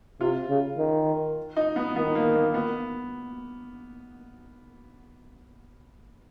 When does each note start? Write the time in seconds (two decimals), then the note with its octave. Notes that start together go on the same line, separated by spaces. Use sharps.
0.21 C3 F4
0.49 C#3
0.78 D#3
1.56 D#4
1.76 B3
1.96 D#3 B3
2.15 A#3
2.35 A#3
2.54 B3